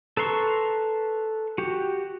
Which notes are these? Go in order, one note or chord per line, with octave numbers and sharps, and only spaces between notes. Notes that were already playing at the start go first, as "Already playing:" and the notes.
A4 B4 A#5 C6 C#6
F#4 G4